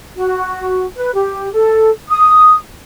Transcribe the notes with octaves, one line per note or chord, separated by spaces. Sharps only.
F#4
B4
G4
A4
D#6